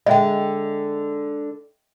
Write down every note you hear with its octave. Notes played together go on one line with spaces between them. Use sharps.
D3 G#3 D#5 E5 G5